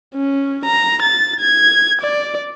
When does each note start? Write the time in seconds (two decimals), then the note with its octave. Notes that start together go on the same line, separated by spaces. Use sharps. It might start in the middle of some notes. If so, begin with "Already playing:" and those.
0.15 C#4
0.65 A#5
1.02 A6
1.41 G#6
2.02 D5